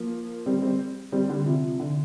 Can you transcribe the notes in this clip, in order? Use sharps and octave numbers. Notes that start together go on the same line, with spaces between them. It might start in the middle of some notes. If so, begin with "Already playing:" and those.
Already playing: F3 A#3
G3 C4
G3 C4
G3 C4
D3 G3
C3 F3
D3